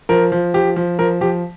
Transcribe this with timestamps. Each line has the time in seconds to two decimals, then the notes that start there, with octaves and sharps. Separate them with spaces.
0.09 F3 A#4
0.32 F3
0.54 F3 G4
0.76 F3
0.99 F3 A#4
1.21 F3 G4